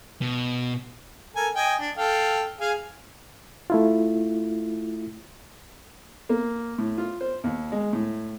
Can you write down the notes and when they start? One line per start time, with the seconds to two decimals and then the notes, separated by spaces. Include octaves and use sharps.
0.21 B2
1.36 A4 A#4 G#5
1.55 D#5 G5 G#5
1.79 D4
1.97 A4 F5 G5
2.61 G#4 F5 G#5
3.70 A3 E4 F4
6.29 A#3
6.78 A2
6.98 F4
7.21 C5
7.44 D#2
7.72 G#3
7.93 A2